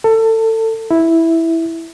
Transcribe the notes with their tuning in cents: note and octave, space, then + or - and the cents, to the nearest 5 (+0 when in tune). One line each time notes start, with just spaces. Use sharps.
A4 +25
E4 -5